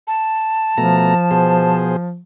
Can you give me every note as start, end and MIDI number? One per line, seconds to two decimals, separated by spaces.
0.07 1.77 81
0.78 1.15 47
0.78 2.20 53
0.78 1.15 57
0.78 1.15 82
1.31 1.96 47
1.31 1.96 68
1.31 1.96 72